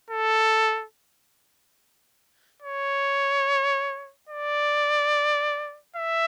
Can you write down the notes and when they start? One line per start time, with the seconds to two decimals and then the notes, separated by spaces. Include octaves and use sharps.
0.10 A4
2.62 C#5
4.29 D5
5.96 E5